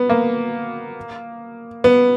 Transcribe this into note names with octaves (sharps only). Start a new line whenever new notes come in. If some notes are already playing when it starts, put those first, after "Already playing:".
Already playing: B3
A#3
B3